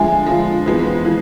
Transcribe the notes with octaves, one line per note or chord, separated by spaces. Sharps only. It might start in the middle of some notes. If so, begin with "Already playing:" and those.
Already playing: D3 F3 G#3 E5 G#5
D3 F3 G#3
F2 E3 G#3 B3
E3 G#3